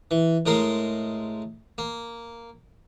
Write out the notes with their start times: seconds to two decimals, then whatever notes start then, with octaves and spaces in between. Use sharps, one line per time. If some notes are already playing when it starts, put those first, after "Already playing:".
0.11 E3
0.46 A2 G#3 A#4 C6
1.78 A#3